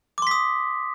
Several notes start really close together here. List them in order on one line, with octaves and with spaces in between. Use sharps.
D6 C6 B6 D#6